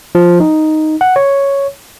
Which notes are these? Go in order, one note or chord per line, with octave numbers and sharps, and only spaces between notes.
F3
D#4
F#5
C#5